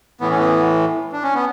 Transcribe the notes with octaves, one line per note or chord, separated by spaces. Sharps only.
A2 E3 B3
C#4
B3
D4
C#4
B3